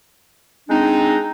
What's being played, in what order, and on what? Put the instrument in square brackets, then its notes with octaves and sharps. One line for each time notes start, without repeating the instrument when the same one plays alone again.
[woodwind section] G#3 C4 D4 D#4